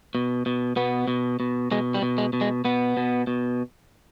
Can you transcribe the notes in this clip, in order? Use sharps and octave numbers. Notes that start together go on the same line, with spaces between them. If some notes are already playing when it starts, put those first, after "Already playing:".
B2
B2
B2 B3
B2
B2
B2 G#3
G3
B2
G#3
B2
G#3
B2 B3
B2
B2